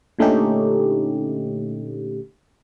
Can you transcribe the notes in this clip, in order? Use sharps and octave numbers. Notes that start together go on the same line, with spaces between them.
A#2 D3 A3 C#4 D#4 G4